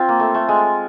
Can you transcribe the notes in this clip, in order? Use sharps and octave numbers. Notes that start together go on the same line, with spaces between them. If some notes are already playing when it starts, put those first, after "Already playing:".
Already playing: C4 F4
A#3
A3
A3
G#3